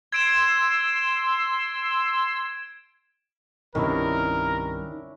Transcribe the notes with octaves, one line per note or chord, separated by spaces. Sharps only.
C6 E6 G#6 D7 E7
C2 G2 C3 D#3 C#4 D4 E4 A#4